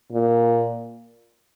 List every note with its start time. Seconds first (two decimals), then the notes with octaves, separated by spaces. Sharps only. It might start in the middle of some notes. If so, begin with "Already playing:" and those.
0.13 A#2